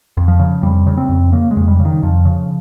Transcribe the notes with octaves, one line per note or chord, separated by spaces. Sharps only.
F2
F3
C#3
F2 G3
C#3
C4
F2
C#3 A#3
G#3
F2
G3
C#3
D#3
F2 F3
C#3